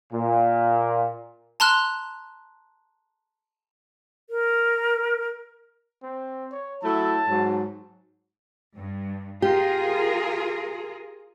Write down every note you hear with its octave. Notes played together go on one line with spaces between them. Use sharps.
A#2
A5 A#5 C6 F6 F#6
A#4
C4
C#5
F#3 A3 E4 A5
G#2 F#3
G2
F4 G4 G#4 A#4